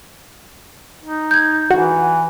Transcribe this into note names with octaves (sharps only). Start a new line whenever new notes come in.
D#4
G6 G#6
E3 F#4